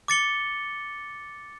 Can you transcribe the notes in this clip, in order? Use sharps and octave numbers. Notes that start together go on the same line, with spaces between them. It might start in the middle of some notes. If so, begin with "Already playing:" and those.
D6 A6 C#7 G7